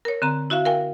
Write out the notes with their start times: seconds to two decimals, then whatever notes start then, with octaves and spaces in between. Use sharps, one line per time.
0.05 A#4 C#5
0.22 D3 C4 A#5
0.50 E4 F#4 E5 F5
0.65 A#4 F5 G5 G#5